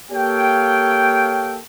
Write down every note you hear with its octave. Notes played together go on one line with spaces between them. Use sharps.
A#3 G4 A4 C#5 F5 G5